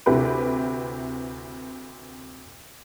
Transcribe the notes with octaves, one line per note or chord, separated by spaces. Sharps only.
D2 C3 E4 G4 B4 B5